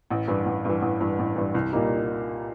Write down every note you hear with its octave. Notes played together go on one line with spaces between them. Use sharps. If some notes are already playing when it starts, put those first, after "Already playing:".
A1
G2 E3
A1
G2 E3
A1
G2 E3
A1
G2 E3
C2
A#2 G3 A#3 D#4